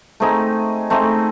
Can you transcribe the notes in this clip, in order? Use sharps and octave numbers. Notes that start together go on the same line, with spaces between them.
A3 C4 D#4 G#4
A3 C4 D#4 G#4